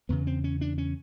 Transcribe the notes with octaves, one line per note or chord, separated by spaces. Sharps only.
E2 C#3 B3
C4
C#4
D4
C#4